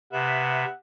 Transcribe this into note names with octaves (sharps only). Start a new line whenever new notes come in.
C3 B3 E5 F#5